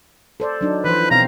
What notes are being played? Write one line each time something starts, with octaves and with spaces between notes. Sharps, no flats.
A4 C5 D5
F#3 D4 D#4
E3 F3 B4 C5
B2 C4 F5 A#5